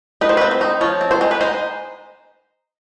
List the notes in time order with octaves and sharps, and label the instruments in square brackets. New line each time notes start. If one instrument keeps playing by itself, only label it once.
[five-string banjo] D#4 B4
C5
C4 B4
C5
D#4
F3 C#5
C4
C5
G#3
B4
D#4 C5